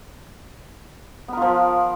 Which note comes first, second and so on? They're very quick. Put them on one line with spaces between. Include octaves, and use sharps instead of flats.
B3 A#4 F4 F3